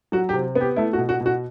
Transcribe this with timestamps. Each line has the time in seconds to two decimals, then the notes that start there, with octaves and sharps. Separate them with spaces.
0.12 F#3 F#4
0.29 G4
0.33 C3
0.55 B3
0.61 G4
0.76 A3 E4
0.93 F#4
0.98 B2
1.09 F#4
1.20 B2
1.26 F#4